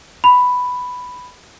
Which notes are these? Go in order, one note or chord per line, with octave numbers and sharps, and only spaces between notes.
B5